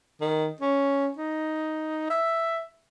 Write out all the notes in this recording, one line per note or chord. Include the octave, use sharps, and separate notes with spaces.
D#3
C#4
D#4
E5